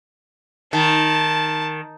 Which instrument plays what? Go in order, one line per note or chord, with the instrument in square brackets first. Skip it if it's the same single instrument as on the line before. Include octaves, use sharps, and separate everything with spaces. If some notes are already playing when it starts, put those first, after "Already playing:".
[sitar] D#3 [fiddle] A5